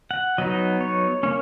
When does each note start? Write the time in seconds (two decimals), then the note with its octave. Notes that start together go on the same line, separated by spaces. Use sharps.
0.11 F#5
0.38 F#3 B3 D#4 D#5
0.81 C#5
1.23 A#3 C#4 C#5